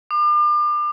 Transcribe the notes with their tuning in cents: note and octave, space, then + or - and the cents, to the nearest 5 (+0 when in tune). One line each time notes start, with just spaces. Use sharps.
D6 +35